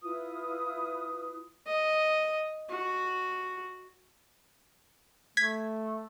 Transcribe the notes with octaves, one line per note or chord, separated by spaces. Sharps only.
E4 F4 B4 D#6
D#5
F#4
A3 G#6 B6